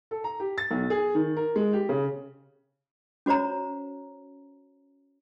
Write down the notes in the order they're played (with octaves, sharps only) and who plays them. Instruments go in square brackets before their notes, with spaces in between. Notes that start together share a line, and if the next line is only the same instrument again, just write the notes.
[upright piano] A4
A#5
G4
A6
B1
G#4
D#3
A#4
G#3
G4
C#3
[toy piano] C#4 F#4 C5 C#5 A#5